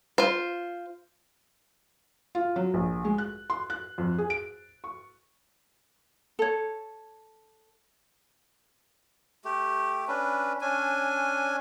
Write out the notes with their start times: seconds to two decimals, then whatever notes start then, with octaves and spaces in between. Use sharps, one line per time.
0.18 F4 C5
2.35 F4
2.56 F#3
2.74 A#1
3.05 G#3
3.18 F#6
3.50 C6
3.70 F#6
3.98 F2
4.18 G#4
4.30 D7
4.84 C#6
6.39 A4 C#5
9.45 A3 G4
10.08 C#4 D4 B4
10.61 C#4 D4 G#5